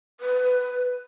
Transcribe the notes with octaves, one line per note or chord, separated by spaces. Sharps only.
B4